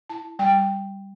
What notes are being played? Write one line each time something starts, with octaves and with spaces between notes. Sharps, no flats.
E4 A5
G3 G5